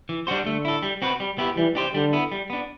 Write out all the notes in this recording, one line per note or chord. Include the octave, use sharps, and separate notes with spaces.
E3
G3 D4 F#4 C5
D3 A3
E4 A4
G3
C4 F#4 B4
G3
B3 E4 G4
E3 G3
D4 G4 C5
D3 G3
B3 E4
G3
B3 D4